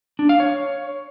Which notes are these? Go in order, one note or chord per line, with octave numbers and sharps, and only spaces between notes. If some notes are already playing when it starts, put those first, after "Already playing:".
D4
F5
C#5